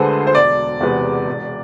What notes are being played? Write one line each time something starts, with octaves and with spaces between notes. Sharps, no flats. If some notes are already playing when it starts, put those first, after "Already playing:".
Already playing: D2 D3 G#3 G#4 A4 B4 C5
C5
E1 D5
E2 C3 G#3 B3
E1